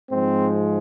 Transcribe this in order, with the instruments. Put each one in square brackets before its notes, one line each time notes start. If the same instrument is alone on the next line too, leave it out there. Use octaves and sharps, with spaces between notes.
[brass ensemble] G#2 F3 G#3 C4